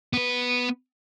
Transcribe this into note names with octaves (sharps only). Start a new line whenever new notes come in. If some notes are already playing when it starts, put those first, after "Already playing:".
B3 B4